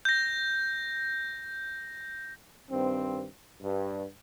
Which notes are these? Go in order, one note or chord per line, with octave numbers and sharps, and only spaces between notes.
G6 A#6
G2 D#3 C4
G2